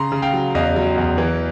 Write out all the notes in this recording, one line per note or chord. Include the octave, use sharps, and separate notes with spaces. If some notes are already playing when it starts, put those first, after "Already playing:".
Already playing: C#3 A#5 C6
C#3
F5 G5
F#3
E2 D#5 F5
F#3
E2
E3